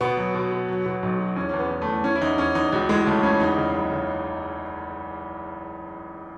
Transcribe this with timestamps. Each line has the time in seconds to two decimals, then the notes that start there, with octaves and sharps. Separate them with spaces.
0.01 B2 B3
0.17 F#3
0.35 B2
0.52 B2
0.69 F#3
0.86 B2
1.03 B1
1.19 F#3
1.36 E2 C#4
1.49 E2 C#4
1.59 B3
1.70 E2
1.82 A3
1.87 E2
2.04 E3 C#4
2.16 E4
2.21 E2 D#4
2.38 E2 C#4
2.55 E2 D#4
2.72 C#2 F#4
2.89 E3 G#3
3.06 C#3 A3
3.23 C#2 C#4
3.40 E2 D#4
3.57 C#3
3.74 F#1
3.91 C#3